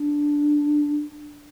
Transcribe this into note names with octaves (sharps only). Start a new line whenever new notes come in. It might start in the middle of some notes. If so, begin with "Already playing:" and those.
Already playing: D4